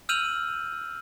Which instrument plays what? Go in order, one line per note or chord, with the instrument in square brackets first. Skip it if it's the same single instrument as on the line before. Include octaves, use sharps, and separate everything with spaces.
[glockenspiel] E6 F6 G6 D#7 F7 F#7